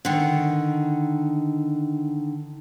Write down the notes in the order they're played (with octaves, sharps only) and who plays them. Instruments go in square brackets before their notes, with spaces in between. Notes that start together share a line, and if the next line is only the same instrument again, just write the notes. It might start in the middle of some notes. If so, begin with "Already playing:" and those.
[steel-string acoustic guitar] D3 D#3